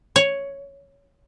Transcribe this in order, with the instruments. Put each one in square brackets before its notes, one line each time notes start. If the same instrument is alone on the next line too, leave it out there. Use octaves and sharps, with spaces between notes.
[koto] C#5